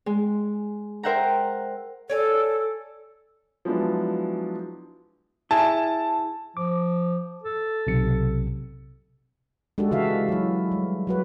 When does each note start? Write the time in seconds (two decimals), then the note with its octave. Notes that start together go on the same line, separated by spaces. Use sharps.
0.06 G#3
1.03 A#4 C5 E5 F#5 G5 A#5
2.10 A4 C#5 D5 G#5
3.65 F3 F#3 G#3 B3 D4 E4
5.51 E4 G#4 A5
6.57 F3 D6
7.44 A4
7.87 B1 C3 C#7
9.78 G#3 D4 F#4 G4 A4
9.91 C#3 E3 F#4 E5 F5
10.29 F#3 E4
10.72 G3
11.07 F#3 F#4 B4